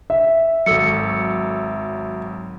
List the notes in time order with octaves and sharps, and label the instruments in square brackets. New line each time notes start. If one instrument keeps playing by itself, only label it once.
[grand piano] E5
[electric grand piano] G#1 F#3 [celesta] A4 E6 C#7